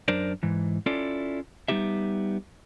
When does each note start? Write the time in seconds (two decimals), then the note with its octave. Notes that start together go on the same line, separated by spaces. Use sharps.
0.08 F#2 D4 A#4 C5 D5
0.43 G#2 E3
0.86 C#4 E4 F4 A4 D5
1.68 G3 B3 D#4 G4 E5